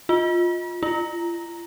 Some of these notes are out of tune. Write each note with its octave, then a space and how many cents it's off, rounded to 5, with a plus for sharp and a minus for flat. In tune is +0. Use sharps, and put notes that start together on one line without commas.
F4 +15
F4 -40